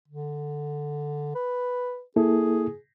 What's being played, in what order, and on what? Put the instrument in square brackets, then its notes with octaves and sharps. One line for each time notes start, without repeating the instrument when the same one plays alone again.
[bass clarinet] D3
B4
[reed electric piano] A#3 E4 A4 [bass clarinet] G#4